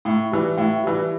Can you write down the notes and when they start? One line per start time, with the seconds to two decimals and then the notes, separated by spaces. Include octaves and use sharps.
0.05 A2
0.32 E3 G3
0.57 A2
0.84 E3 G3